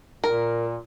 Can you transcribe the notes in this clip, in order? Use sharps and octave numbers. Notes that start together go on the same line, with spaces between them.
A#2 A#4